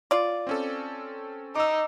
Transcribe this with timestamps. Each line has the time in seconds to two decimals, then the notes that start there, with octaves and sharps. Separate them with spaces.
0.11 F4 D5
0.47 C4 C#4 A4
1.55 D#4 D6 E6